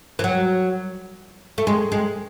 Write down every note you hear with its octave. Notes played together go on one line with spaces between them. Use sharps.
E3
F#3
A3
G#3
G#3